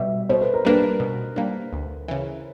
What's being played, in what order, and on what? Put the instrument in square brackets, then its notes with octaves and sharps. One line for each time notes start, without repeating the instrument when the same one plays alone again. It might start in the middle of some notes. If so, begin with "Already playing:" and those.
Already playing: [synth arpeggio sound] B2 G3 [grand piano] E5
[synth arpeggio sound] B2 [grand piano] C5
[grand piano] B4
A#4
[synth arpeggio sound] G3 A#3 D4 [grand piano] B4
[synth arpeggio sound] B2
G3 A#3 D4
D2
C#3 E3